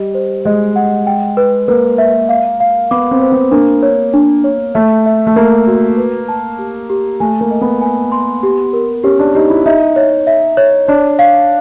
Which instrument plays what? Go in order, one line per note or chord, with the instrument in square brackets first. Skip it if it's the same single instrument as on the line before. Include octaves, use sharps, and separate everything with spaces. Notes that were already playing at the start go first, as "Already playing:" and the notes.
Already playing: [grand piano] G3 [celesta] D#5
[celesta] C5
[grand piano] G#3 [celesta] D#5
[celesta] F#5
G5
B4
[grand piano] A#3 [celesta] B4
[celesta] E5
F5
F5
[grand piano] B3 [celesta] D6
[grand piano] C4
[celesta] C5
[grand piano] B3
[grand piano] A#3 [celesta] D4
[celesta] C#5
D4
C#5
[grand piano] A3 [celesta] E5
[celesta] E5
[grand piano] A3
[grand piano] A#3 [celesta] E5
[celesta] F#4
B4
A5
G4
G4
[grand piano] A3 [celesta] G#5
[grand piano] A#3
[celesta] D#5
[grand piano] B3
[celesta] G#5
C6
G4
A#4
[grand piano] C#4 [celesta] G4
[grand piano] D4
[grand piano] D#4 [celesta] G4
[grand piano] E4
[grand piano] D#4 [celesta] E5
[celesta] C#5
E5
C#5
[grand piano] D4 [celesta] C#5
[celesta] F5